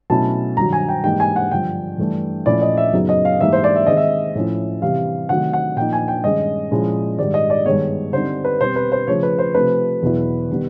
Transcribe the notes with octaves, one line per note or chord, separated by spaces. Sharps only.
B2 F#3 A3 C#4 E4 A5
G2 D#3 F#3 A#5
G#5
G5
G#2 E3 G3 A#3 D#4 G5
G#5
F#5
G2 D3 F3 G5
G2 E3 A3 D4
A#2 F3 A3 C#4 E4 D5
D#5
E5
F#2 C#3 F#3 B3 D#4
D#5
F5
G#2 E3 G3 A#3 D#4 E5
C5
D5
E5
D#3 G#3 C4 D#5
E5
A2 F3 A3 C#4 E4
C3 E3 G3 F5
C3 D#3 F#3 A3 F#5
F#5
A#2 F3 A#3 D#4 G5
G#5
G5
G2 D#3 G#3 C#4 D#5
A#2 F3 G#3 C#4 E4
G#2 D#3 G3 D5
D#5
D5
G2 D#3 G#3 B3 C#5
D3 G3 C4 D#4 C5
B4
B2 G3 C4 C5
B4
C5
C#3 F3 A3 C#5
B4
C5
C3 F3 A3 C4 B4
E2 B2 F#3 B3 E4
D#3 G3 B3